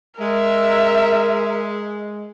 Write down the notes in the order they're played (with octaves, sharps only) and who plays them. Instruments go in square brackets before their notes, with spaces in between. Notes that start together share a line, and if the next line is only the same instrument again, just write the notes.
[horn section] G#3 [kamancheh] A#4 E5